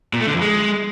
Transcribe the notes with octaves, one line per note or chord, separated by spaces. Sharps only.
A#2
A3
D3
F2
G#3